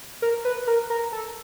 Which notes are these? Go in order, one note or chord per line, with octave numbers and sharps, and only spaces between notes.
A#4
B4
A#4
A#4
A4